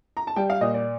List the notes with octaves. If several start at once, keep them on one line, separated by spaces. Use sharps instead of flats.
A#5
A5
G3 G5
F5
A#2 D#5
D5